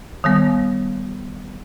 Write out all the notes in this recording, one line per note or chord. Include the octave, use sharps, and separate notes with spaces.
D#3 G3 B3